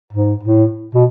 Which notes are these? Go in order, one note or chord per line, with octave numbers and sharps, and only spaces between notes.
G#2
A2
B2